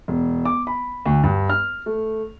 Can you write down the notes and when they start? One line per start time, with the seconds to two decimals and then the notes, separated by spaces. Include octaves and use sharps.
0.08 E1
0.45 D6
0.67 B5
1.06 D2
1.24 G2
1.50 F6
1.86 A3